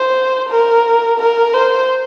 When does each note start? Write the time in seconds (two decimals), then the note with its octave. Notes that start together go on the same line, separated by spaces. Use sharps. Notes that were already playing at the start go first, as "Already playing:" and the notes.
Already playing: C5
0.49 A#4
1.19 A#4
1.53 C5